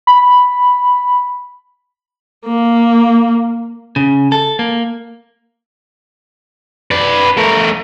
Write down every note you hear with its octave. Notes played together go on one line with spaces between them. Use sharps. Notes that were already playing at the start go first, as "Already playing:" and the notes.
B5
A#3
C#3
A4
A#3
B4 D5
A3 A#4